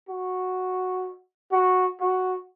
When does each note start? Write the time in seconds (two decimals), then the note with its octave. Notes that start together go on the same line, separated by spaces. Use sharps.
0.09 F#4
1.52 F#4
2.01 F#4